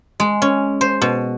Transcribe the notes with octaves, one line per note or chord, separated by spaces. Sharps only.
G#3
C#4
C5
B2